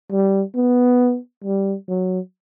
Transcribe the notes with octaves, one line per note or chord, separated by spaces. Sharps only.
G3
B3
G3
F#3